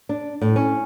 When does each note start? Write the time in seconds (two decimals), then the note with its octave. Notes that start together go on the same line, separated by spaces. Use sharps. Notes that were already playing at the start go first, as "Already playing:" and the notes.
0.09 D4
0.41 A2
0.56 C#4